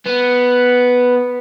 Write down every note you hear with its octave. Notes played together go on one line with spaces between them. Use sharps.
B3